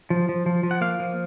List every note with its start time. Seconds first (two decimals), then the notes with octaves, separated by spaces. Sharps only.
0.10 F3
0.29 F3
0.46 F3
0.63 F3
0.71 F#5
0.81 A#3 F5
1.00 F3